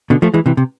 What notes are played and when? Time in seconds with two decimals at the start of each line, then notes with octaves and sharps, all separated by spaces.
0.10 B2 D3
0.22 F3 A3
0.34 E3 G#3
0.46 C3 E3
0.57 C3